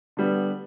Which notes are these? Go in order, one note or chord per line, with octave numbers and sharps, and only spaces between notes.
D3 G3 B3